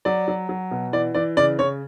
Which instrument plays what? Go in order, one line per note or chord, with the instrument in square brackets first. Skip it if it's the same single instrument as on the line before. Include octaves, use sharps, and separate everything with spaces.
[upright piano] F#3 D5
F#3
F#3
B2
E3 D5
E3 D5
C#3 D5
C#3 C#5